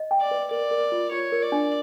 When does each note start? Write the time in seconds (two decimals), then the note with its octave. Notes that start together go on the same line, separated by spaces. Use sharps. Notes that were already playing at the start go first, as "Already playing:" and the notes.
Already playing: D#5
0.11 G5
0.21 D5
0.31 B4
0.51 A#4 D5
0.71 A#4
0.92 F4
1.12 F4 C#5
1.32 A#4
1.43 D5
1.52 D4